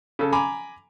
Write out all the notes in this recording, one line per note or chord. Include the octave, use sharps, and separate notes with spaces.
C#3 A4
G#5 A#5 B5 D6